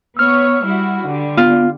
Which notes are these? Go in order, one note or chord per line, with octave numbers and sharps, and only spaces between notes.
B3 C#5 E6 F6
G3 E4 F#4
D3 G3
B3 F4